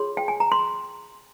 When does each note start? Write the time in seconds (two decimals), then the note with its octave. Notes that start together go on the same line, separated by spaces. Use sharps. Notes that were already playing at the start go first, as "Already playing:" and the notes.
Already playing: F4 G#4 C#5 C6
0.17 G5
0.28 G#5
0.40 A#5
0.52 C6